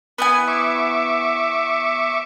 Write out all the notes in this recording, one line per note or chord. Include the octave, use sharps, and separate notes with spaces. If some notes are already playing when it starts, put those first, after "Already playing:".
B3 E4 G#5
E5 C#6 D6